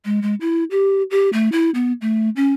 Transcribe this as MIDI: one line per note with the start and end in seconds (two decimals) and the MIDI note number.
0.05 0.22 56
0.22 0.35 56
0.41 0.64 64
0.71 1.03 67
1.11 1.29 67
1.33 1.49 57
1.52 1.70 64
1.75 1.93 59
2.01 2.30 57
2.36 2.54 61